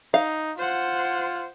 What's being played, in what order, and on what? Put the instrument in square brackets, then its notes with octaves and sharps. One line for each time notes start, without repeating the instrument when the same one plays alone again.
[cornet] D#4 [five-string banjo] F5
[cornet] F4 [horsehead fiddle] C5 F#5